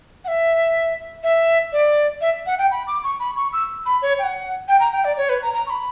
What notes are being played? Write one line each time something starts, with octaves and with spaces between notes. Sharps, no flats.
F#5
E5
E5
D5
E5
F#5
G5
B5
D6
C#6
B5
C#6
E6
B5
C#5
G5
F#5
G5
A#5
G5
D5
C#5
B4
A#5
A#5
C#6
B5